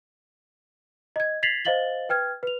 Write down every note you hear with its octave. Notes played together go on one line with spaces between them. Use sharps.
D#5 G#6
G#6 A6 B6 C7 F7 F#7
C5 D#5 F5 A6 F#7 G7
B4 G5 F6 G#6
B4 F7